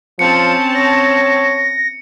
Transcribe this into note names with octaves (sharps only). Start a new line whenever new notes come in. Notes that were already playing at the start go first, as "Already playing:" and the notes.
F3 C4 C#4 A5 C#7
C#5 A#6